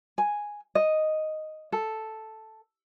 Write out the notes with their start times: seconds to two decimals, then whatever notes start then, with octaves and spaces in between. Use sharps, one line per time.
0.18 G#5
0.75 D#5
1.72 A4